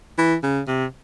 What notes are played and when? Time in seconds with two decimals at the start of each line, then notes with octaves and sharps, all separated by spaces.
0.18 E3
0.43 C#3
0.68 C3